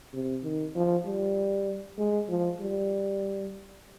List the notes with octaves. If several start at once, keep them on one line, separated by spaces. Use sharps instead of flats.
C3
D#3
F3
G3
G#3
F3
G3